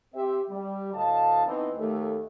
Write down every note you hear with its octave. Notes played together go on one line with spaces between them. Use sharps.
C4 G4 E5
G3
D2 A2 D#5 F5 A5
E3 B3 C4 D#4
D#2 A3